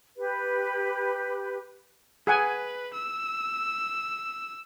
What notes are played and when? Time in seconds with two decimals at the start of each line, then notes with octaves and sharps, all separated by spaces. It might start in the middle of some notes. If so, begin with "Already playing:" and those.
0.17 G4 B4
2.27 G#4 B4 F#5 G#5
2.93 E6